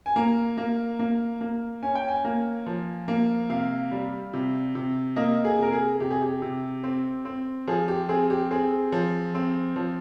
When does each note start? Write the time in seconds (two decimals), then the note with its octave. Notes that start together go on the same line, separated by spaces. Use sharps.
0.06 G#5
0.16 A#3 A#5
0.57 A#3
0.99 A#3
1.41 A#3
1.82 C#4 G#5
1.95 G5
2.08 G#5
2.25 A#3
2.66 F3
3.08 A#3
3.49 C3 F5
3.91 G3
4.33 C3
4.75 C3
5.16 A#3 D#5
5.45 G#4
5.58 C3 A#4
5.72 G#4
6.00 C3 G4
6.11 G#4
6.21 G4
6.42 C3
6.84 C4
7.25 C4
7.67 F3 G#4
7.88 G4
8.09 C4 G#4
8.30 G4
8.51 C4 G#4
8.92 F3
9.35 C4
9.76 F3